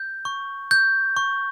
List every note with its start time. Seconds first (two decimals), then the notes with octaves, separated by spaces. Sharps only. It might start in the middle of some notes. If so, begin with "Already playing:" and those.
Already playing: G6
0.25 C#6
0.71 G6
1.17 C#6